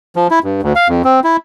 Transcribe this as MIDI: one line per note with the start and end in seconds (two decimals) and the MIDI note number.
0.16 0.27 53
0.31 0.39 64
0.44 0.61 43
0.63 0.73 38
0.76 0.88 77
0.89 1.02 41
1.04 1.20 60
1.24 1.37 64